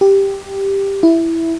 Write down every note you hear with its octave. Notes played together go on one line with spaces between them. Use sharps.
G4
E4